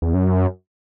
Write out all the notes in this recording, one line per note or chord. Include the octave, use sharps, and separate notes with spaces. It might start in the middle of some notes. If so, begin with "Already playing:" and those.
E2
F#2